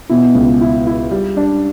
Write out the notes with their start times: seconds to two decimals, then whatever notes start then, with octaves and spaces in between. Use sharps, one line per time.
0.09 B2 E4
0.35 C#2
0.61 E4
0.87 E4
1.11 G3
1.37 D4